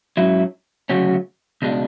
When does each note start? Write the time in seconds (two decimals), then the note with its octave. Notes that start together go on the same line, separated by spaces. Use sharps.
0.17 G#2 F#3 C#4 E4
0.90 D2 C#3 F#3 C#4 F#4
1.62 C#2 B2 G#3 D4